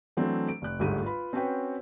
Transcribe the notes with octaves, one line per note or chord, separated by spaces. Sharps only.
E3 F#3 A3 C4 D4
D7
F1 F#6
G1 D2 G#2 A3 G4 D#7
F4 B4 B5
C4 C#4 F#4 B4 C#5 G5